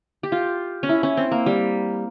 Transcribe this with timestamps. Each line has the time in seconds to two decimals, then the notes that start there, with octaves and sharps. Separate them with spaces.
0.23 G4
0.32 F4
0.83 C#4
0.89 E4
1.03 C#4
1.17 C4
1.32 A#3
1.46 G3